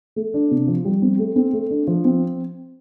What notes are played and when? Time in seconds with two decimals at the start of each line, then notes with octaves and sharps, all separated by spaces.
0.16 A3
0.34 D4
0.51 C3
0.68 F3
0.85 G3
1.02 C4
1.19 A3
1.36 C4
1.53 A3
1.71 D4
1.87 F3
2.05 C4